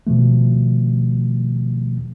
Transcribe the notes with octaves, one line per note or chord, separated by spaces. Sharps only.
B2 D#3 F3 A3